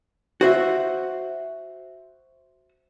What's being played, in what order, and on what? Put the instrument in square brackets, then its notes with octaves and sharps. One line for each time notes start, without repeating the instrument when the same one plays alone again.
[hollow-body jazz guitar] F#4 C5 E5